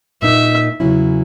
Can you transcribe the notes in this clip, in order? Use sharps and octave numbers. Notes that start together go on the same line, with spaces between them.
A#2 A#3 D#4 E5
E2 C#3 F#3 C#4 E4